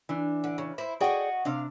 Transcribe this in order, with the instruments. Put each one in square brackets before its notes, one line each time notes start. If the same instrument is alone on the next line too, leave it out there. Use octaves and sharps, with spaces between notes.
[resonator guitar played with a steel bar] E3 D4
[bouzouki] D3
C#3
E4 C5
[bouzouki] F#4 D#5 [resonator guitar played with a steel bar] G#4 D5 G5
[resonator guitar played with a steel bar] C3 D4 [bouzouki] F5